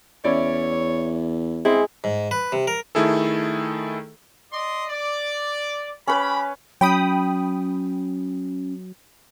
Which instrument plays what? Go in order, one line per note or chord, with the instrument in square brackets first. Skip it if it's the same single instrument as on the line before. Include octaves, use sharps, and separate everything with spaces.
[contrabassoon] E2 [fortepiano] C#4 E4 D5 [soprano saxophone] C#5
[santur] G#3 [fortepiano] C4 [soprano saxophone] E4
[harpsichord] G#2
B4
C3
A#4
[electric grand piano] D#3 A3 E4 G#4 A4
[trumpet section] D5 D#5 C6
D5
[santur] C#4 B4 [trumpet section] G4 B5
[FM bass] F#3 [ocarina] C#4 [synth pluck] G5 B5 D#6